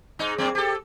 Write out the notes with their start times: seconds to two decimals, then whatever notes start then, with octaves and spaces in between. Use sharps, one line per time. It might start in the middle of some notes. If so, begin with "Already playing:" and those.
0.19 G#2 D#4
0.38 F#2 A#3 C4
0.55 G4 A4